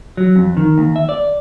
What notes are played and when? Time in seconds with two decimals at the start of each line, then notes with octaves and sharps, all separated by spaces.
0.17 F#3
0.36 F2
0.57 D#3
0.78 D#2
0.96 E5
1.09 D5